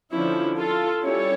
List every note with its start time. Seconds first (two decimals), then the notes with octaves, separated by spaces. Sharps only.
0.13 D3 F3 C#4 E4
0.59 F4 A4
1.03 G3 C#4 E4 A4 C#5